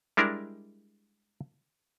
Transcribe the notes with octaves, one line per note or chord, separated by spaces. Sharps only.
G3 G#3 D4 E4 A#4